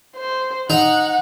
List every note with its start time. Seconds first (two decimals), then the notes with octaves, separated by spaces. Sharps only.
0.16 C5
0.70 D#4 F#5